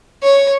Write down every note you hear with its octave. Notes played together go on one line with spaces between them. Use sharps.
C#5